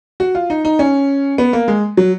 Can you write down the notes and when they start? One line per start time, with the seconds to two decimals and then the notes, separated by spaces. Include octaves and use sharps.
0.20 F#4
0.35 F4
0.50 D#4
0.65 D#4
0.79 C#4
1.38 B3
1.53 A#3
1.68 G#3
1.97 F#3